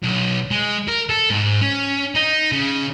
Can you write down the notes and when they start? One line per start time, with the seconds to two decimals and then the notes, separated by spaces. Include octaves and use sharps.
0.03 B1
0.51 G#3
0.88 A#4
1.10 A4
1.30 G#2
1.61 C#4
2.15 D#4
2.52 C#3